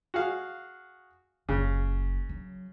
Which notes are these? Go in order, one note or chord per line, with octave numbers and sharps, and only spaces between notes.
F#4 G#4 F5
F#1 C#3
F#3